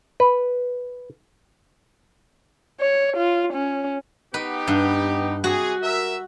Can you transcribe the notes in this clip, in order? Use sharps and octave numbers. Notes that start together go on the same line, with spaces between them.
B4
C#5
F4
C#4
B3 D#4 G4 B4
G2
C3 F#4 G#4
A#4 E5